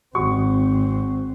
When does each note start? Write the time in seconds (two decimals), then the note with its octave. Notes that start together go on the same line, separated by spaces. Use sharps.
0.15 G#1 C4 F#4 C#6